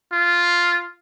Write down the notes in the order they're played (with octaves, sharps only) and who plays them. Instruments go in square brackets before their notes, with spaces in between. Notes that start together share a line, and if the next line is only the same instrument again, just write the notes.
[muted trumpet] F4